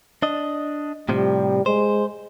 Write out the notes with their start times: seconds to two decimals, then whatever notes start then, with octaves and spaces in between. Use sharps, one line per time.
0.22 D4 D#5
1.09 A2 C3 F3 G3
1.66 G#3 C5